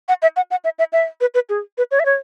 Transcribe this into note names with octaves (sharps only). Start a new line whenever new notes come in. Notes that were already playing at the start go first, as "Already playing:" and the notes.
F#5
E5
F#5
F#5
E5
E5
E5
B4
B4
G#4
B4
C#5
E5
C#5